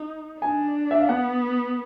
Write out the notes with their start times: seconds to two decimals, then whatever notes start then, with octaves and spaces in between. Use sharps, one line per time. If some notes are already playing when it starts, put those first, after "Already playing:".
Already playing: D#4
0.41 D4 G#5
0.91 E5
1.00 F5
1.09 B3 F#5